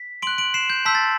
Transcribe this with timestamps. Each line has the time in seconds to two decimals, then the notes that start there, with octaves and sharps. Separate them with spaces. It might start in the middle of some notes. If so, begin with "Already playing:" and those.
Already playing: B6
0.22 C6 F#6 D7 F#7
0.38 D7 F#7
0.54 C7 E7
0.70 G6
0.85 A5 C6 E6 G6 B6
0.95 A6